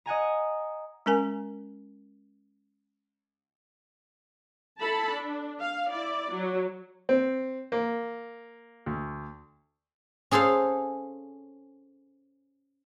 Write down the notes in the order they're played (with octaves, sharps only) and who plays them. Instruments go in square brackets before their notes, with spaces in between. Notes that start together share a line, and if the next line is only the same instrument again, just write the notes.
[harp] D#5 F#5 G#5 A#5
[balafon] G#3 C#4 A#4 G#5
[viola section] E4 A4 A5 B5
D4
F5
E4 D5
F#3
[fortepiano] C4
A#3
D2
[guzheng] C#4 G#4 A4 C5 F5